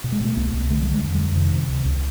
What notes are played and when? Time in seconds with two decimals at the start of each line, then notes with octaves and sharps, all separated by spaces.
0.04 B2
0.12 G#3
0.21 B2 A3
0.37 C2 A#3
0.54 C2
0.70 D3 A3
0.82 D3 G3
0.92 G#3
1.03 F2
1.14 G3
1.20 F2
1.36 C3 D#3
1.53 C3
1.69 C#2
1.86 C#2